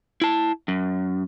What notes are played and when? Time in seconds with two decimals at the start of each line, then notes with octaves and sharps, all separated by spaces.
0.21 E4 A5
0.68 F#2